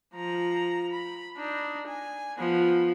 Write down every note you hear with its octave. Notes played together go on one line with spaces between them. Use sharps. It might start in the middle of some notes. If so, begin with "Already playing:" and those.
F3 A#5
B5
D4 D#4
G#5
F3 B3